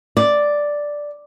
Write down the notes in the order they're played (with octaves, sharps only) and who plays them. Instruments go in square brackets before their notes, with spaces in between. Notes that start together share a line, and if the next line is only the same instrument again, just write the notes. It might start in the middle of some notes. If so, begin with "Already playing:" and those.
[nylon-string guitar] D5